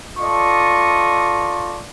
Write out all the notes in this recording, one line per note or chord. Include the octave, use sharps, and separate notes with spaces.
F4 A4 D5 D#5 C#6